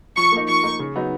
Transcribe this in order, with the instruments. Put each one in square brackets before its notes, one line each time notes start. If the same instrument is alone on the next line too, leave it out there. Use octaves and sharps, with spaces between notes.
[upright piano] F3 [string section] C#6
[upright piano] A#3 D#4
[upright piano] F3 [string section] C#6
[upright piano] A#3 D#4
C#3
F#3 B3 D#4